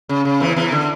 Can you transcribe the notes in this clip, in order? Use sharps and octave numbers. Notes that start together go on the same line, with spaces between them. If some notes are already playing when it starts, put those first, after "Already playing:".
C#3
C#3
E2 E3
E2 E3
D3